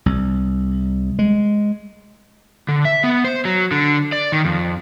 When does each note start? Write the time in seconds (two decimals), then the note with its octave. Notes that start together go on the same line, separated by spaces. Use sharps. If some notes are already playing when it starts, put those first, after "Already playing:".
0.06 C2
1.19 G#3
2.68 D3
2.85 E5
3.04 B3
3.24 C5
3.45 F#3
3.71 D3
4.12 D5
4.32 D#3
4.45 F2